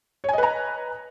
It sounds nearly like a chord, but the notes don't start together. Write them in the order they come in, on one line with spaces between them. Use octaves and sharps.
C#5 G#5 D#5 B4 A#5